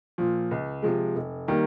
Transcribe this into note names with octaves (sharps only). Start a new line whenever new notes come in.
A#2 F3
C#2
C3 F3 G#3
F1
D#3 G3 A#3